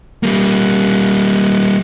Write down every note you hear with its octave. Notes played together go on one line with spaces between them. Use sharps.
G3 A#3